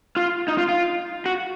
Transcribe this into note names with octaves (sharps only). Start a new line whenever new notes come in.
F4
D#4
F4
F4
F#4